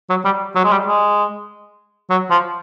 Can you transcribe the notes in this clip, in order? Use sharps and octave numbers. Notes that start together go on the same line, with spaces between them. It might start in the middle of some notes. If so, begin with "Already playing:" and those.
F#3
G3
F#3
G#3
G3
G#3
F#3
F3